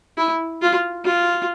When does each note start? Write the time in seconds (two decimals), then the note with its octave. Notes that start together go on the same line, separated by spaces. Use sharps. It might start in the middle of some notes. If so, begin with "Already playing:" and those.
0.18 E4
0.62 F4
1.05 F4